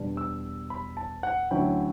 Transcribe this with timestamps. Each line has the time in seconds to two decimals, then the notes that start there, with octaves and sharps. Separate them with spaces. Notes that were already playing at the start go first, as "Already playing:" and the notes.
Already playing: E2 B2 G3 D4
0.17 E6
0.70 B5
0.97 A5
1.23 F#5
1.51 D2 D3 F#3 C#4 E4 G5